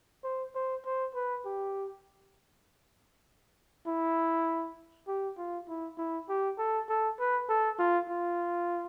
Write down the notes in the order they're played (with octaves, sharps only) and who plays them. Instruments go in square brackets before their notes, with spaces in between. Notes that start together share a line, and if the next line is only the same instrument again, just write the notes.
[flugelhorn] C5
C5
C5
B4
G4
E4
G4
F4
E4
E4
G4
A4
A4
B4
A4
F4
F4